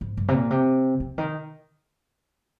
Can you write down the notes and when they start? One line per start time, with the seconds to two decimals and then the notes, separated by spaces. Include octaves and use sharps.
0.01 G#2
0.17 G2
0.28 C3
0.34 A#2
0.51 C3
1.00 C3
1.18 D#3